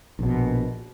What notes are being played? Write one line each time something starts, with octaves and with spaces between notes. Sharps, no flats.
A#1 B2